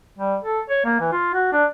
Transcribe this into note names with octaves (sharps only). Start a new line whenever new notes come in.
G3
A4
C#5
A#3
E3
F4
F#4
D4